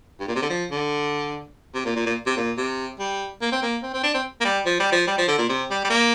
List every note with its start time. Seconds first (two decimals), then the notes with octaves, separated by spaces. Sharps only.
0.20 G2
0.28 A#2
0.35 C3
0.42 D3
0.49 F3
0.71 D3
1.74 C3
1.85 A#2
1.96 A#2
2.06 A#2
2.26 C3
2.37 A#2
2.57 C3
2.99 G3
3.41 A#3
3.51 C4
3.62 A#3
3.83 C4
3.94 C4
4.03 D4
4.14 C4
4.40 A#3
4.44 G3
4.65 F3
4.80 G3
4.92 F3
5.07 G3
5.18 F3
5.28 D3
5.38 A#2
5.49 C3
5.70 G3
5.84 G3
5.90 A#3